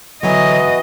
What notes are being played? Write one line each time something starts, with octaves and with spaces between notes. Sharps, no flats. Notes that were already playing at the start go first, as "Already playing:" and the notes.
D3 E3 F#3 B3 F#4 D#5